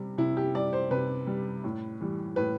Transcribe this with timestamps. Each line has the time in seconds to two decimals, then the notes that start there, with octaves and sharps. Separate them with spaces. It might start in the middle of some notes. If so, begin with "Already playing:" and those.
Already playing: C3 G3
0.18 C3 E4
0.37 G4
0.54 G3 D5
0.73 C5
0.91 C3 B4
1.27 G3
1.64 A2
2.01 E3 G3
2.36 A2 B4